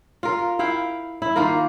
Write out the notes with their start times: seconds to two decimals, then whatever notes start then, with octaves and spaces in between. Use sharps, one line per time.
0.23 F4 A#4
0.59 E4 F5 G5
1.22 E4
1.36 D#3 A#3 F4 A#4